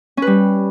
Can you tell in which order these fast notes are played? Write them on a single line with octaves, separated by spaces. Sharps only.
C#4 B4 G3